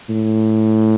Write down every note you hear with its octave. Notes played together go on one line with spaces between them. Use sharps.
A2